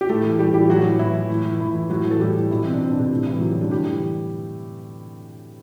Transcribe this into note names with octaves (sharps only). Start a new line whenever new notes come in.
G4
A2 A3 A4
E3
A2 G3 G4
E3 G3 G4
A2 F#3 F#4
E3
A2 E3 E4
E3
A2
E3
A2 E3 E4
E3
A2 F#3 F#4
E3
A4
A2 G3 G4
E3
B2 E3 E4
C4
D4
B2 C4
D4
C3 C4
A2
E3
G3
A2 F#3
G3
D3 E3 D4
A2 G3 G4
E3